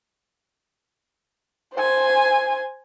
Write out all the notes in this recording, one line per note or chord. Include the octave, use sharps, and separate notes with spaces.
C5 G#5